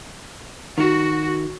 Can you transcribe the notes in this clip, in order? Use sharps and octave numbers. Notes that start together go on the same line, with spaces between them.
D#3 F#4